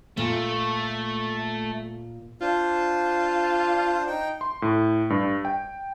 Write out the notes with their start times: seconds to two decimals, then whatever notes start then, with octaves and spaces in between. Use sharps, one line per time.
0.17 A#2 A3
2.41 D4 F4 C5
4.07 D#4 G5
4.41 C6
4.62 A2
5.10 G2
5.45 G5